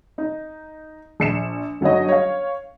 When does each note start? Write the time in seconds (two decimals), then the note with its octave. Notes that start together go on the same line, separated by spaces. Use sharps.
0.18 D#4
1.20 A#1 C#7 E7
1.81 G1 F#3 D#4 C#5 D#5
2.09 C#5 F5